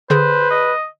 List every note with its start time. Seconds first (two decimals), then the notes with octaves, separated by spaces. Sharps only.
0.10 D3 G#4 B4 C5
0.51 D#5